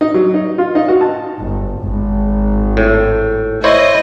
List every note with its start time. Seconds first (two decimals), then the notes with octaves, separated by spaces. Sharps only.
0.01 D#4
0.14 F#3
0.34 D#4
0.58 F4
0.75 D#4
0.88 F#4
1.01 A5
1.38 G1
1.79 G#1
2.77 A2
3.64 E4 C5 C#5 D#5